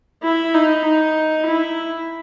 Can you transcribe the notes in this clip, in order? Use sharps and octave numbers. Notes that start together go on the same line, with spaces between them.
E4
D#4
D#4
E4